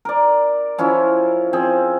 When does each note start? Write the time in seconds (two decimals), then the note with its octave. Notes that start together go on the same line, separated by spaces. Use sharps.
0.05 A#4 D5
0.78 F3 C#4 E4 F4
1.53 F3 C4 G#4